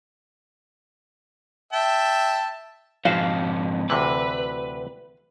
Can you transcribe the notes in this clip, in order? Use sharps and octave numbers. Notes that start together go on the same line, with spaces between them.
E5 G5 A5
F2 G#2 F#4 B4 C5 F5
D2 C3 E3 B4